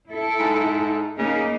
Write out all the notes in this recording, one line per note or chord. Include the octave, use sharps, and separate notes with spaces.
E4 A4
G#2
C#3 A#3 D#4